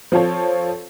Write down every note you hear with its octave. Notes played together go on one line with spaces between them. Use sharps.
F3 C4 F4 A4 C#5